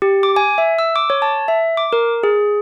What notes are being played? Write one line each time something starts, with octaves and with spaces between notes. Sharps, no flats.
G4
D6
G#5
E5
E6
D6
C#5
A5
E5
D6
A#4
G#4